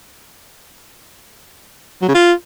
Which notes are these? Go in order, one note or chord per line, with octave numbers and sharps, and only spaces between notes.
F#3
C#3
F4